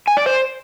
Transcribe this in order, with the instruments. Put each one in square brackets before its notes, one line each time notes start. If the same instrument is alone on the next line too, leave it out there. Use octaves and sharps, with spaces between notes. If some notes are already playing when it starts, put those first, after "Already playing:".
[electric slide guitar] G#5
D5
C5